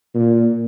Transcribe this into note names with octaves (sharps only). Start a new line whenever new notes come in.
A#2